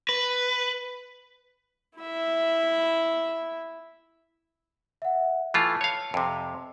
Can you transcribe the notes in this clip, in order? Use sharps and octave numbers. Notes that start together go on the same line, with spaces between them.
B4
E4 E5
E5 F#5
E3 A3 F4 A5
C#5 F5
F2 C3